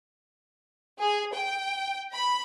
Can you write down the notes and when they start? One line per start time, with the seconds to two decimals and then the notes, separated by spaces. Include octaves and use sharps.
0.99 G#4
1.33 G5
2.13 B5